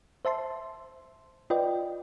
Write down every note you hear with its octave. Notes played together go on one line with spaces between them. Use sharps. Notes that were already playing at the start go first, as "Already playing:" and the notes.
C5 E5 A5 C6
F4 B4 D5 D#5 G5